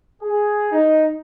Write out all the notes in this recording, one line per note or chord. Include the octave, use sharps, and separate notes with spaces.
G#4
D#4